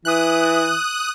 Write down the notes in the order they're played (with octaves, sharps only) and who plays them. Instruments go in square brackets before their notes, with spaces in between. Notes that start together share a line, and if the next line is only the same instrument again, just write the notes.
[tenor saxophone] E3 [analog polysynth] D#6 F#6